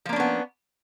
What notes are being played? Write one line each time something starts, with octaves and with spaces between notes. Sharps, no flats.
F3 A#3 B3 C#4 D4